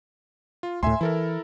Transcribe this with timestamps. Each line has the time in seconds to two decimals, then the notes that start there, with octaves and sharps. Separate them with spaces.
0.63 F4
0.83 D2 A2 E5 G#5 C6
1.01 E3 E4 A4 A#4